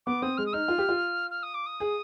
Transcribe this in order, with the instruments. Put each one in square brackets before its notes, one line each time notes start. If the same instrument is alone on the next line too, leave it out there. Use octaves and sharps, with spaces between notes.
[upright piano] B3 [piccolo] D6
[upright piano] C4 [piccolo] D#6
[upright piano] G#3 [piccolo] F6
[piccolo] D#6
[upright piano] D#4 [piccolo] F6
[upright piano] F4
G4
F4
[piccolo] F6
D#6
D6
D#6
[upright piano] G#4